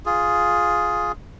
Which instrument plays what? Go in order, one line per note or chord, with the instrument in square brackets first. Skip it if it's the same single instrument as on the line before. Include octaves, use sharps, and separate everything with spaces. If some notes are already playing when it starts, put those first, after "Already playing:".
[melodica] F4 G#4